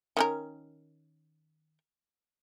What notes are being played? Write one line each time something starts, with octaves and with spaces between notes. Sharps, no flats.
D#3 C#4 A#4